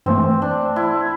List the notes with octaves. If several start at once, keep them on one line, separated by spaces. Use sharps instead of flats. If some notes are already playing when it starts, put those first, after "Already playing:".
G2 E3 A3 C4
D4
E4